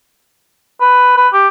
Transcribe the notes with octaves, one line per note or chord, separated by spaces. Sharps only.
B4
B4
G4